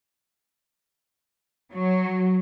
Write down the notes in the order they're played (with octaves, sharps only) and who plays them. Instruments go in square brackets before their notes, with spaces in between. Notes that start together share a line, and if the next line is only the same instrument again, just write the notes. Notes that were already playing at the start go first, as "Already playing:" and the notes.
[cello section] F#3